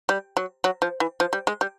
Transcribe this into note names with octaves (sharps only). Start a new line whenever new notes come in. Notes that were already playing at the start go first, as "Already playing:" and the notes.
G3
F#3
F#3
F3
E3
F3
G3
G#3
G3